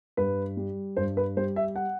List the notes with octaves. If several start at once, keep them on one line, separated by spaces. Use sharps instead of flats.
G2 B4
G3
G2 C5
B4
G3 C5
E5
F#5